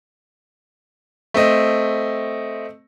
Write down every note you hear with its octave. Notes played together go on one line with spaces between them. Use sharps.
A3 C4 D#5